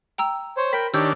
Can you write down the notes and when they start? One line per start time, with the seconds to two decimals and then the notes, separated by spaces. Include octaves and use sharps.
0.18 G5 A#5 E6
0.57 C5 C#5
0.73 A#4 G5 B5 B6
0.94 D#3 D4 G4 C#5 E6 G6